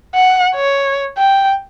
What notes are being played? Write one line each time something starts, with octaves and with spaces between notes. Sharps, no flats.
F#5
C#5
G5